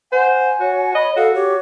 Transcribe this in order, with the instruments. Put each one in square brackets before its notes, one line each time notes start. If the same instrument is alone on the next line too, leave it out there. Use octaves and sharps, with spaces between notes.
[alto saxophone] C5 [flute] F#5 [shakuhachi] G#5
[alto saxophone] F#4 [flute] C#5
[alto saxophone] D#5 [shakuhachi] B5
[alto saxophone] F#4 [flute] A4 [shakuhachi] F5
[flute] G4 [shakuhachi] C#5